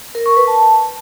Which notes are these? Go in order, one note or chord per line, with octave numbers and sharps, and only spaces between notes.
A#4
C#6
B4
A5